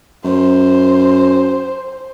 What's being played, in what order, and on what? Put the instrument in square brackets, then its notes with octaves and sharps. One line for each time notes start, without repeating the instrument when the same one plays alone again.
[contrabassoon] F#2 [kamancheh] C5